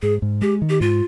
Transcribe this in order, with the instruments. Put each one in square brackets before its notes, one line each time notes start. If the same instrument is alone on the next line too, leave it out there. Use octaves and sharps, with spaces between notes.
[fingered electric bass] G#2 [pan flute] G#4
[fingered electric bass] G#2
[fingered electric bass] G#3 [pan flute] G4
[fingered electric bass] D#3
[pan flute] G4
[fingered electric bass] G#2 [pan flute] F4